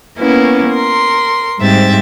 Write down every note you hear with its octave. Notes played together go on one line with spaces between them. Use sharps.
A#3 B3 C#4 E4 B4
A#4 C6
G#2 G3 C4 E5 A6